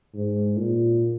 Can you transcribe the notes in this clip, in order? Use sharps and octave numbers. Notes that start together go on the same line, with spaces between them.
G#2
A#2